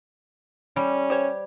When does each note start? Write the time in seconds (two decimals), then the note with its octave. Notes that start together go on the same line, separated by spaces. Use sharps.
0.76 G3 C#4
1.10 G4 C5 C#5